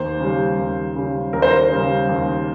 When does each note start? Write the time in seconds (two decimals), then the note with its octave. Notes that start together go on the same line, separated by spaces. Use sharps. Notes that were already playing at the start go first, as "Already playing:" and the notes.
Already playing: D#2 C5
0.20 C#3 G3
0.59 D#2
0.96 C#3 G3
1.33 D#2 A#4
1.42 C5
1.51 A#4
1.72 C#3 G3
2.09 D#2